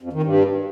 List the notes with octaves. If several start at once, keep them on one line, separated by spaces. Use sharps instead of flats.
F2
D#3
G2